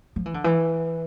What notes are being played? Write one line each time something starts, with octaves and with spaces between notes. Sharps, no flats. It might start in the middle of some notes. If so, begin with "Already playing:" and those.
F3
E3
D3
E3